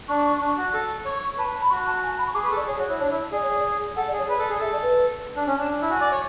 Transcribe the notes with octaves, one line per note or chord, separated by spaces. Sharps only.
D4 C#6
D4
F#4
A4
C#5 C#6
B4 A5
A5
B5
F#4 C#6
A5
G#5
A5
B5
C#6
G#4 D6
B4 C#6
A4
D5
G#4 C#5
F#4 C#5
E4 C#5
D4 C#5
E4
G#4 D5
C#5
D5
A4 F#5
D5
G#4
C#5
B4 D5
A4
G#4
A4 E5
D5
B4
D4
C#4
D4 A5
E4
F#4 G#5
D5
C#5